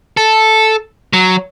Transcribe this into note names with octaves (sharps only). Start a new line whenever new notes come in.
A4
F#3